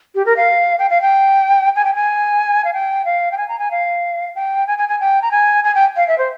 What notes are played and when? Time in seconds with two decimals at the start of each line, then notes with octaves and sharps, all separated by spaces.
0.15 G4
0.26 A#4
0.37 F5
0.79 G5
0.90 F5
1.02 G5
1.76 G#5
1.85 G5
1.95 G#5
2.64 F5
2.73 G5
3.05 F5
3.32 G5
3.38 G#5
3.49 A#5
3.59 G#5
3.71 F5
4.36 G5
4.67 G#5
4.78 G#5
4.89 G#5
5.00 G5
5.22 A#5
5.31 G#5
5.64 G#5
5.75 G5
5.96 F5
6.08 E5
6.18 C5